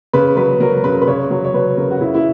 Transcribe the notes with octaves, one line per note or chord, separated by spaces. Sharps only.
C#3 B4
F#3 B4
F#3 A#4
C#3 B4
B4
C#3 C#5
F#3
C#5
F#3 B4
C#3 A#4
F#4
C#3 E4
E4